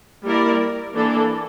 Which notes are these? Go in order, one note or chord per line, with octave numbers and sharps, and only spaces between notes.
G3 A#3 E4 A#4 D5
E3 A#3 D4 A4